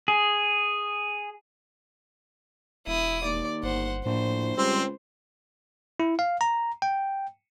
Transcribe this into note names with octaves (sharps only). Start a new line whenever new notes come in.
G#4
E1 E4 D#6
D#2 D5
G1 C5 F#5
A#1 A2 C5
C#2 G3 C4
E4
F5
A#5
G5